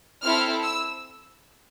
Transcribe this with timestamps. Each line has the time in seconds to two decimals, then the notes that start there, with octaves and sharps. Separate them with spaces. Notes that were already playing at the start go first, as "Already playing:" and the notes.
0.22 C4 E4 A4 F6
0.63 E6